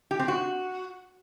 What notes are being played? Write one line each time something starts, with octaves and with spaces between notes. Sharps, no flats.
G4
C4
F#4